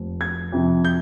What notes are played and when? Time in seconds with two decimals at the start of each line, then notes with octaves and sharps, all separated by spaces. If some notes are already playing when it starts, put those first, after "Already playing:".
Already playing: F1
0.21 G#6
0.52 F2 C3 F3
0.85 G6